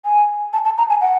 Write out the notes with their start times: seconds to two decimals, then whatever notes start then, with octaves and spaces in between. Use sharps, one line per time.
0.05 G#5
0.53 A5
0.65 A5
0.78 A#5
0.90 G#5
1.01 F#5